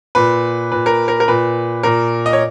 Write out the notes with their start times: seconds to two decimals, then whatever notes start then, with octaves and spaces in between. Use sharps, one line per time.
0.15 A#2 B4
0.72 A#2 B4
0.86 A#4
1.08 A#4
1.20 A#4
1.28 A#2 B4
1.83 A#2 A#4
2.26 D#5
2.33 C#5